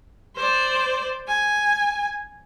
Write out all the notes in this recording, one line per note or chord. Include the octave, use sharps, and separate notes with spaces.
C5 D5
G#5